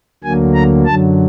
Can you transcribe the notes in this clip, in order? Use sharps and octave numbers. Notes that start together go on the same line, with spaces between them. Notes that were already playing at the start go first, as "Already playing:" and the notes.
D2 D3 F#3 A#3 G#5
A#5
F#2 D3 F#3 A5